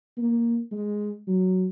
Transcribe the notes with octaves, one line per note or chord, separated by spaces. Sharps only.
A#3
G#3
F#3